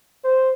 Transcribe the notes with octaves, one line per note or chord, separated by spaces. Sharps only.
C5